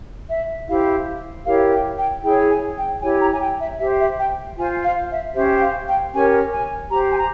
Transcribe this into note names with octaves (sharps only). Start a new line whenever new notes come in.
E5
E4 G4 C5 F5
E4 G4 A#4 C#5 F5
G5
G5
E4 G#4 C#5 G5
G#5
G5
E4 G4 C#5 G#5
A#5
G#5
G5
E5
G4 C5 E5
E5
G5
F4 C5 G#5
F5
E5
C#4 G4 C5 E5
G5
F5
G5
C#4 G4 A#4 C#5 G#5
G#5
G4 C5 A#5
G#5
A#5